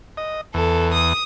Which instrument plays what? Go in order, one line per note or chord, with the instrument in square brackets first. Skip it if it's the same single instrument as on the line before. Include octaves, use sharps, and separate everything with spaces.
[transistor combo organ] D#5
[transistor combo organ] E2 [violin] A4
[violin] D#6